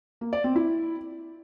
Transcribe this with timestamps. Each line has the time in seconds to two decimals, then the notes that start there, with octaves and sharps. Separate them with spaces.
0.21 A#3
0.33 D5
0.44 C4
0.55 E4